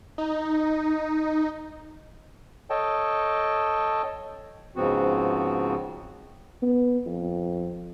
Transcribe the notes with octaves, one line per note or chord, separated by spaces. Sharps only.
D#4
A4 C#5 D#5 G5 A5
G#2 C#3 F3 B3 C4 F#4
B3
F2